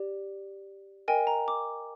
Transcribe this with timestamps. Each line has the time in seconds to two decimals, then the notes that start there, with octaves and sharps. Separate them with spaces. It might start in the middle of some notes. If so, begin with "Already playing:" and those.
Already playing: G4 D5
1.08 A#4 D#5 G5 G#5
1.27 A#5
1.48 D6